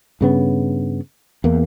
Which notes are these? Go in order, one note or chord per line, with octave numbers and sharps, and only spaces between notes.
G2 C#3 B3
E2 A#3